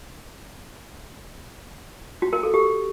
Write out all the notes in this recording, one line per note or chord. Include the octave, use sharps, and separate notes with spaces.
F#4
A#4
A4
G4